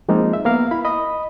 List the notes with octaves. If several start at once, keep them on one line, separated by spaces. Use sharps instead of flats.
F3 G#3 A#3 C4 D#4 F4
E5
A#3 B3 A#4 F5
E4 B5
D#5 B5 D#6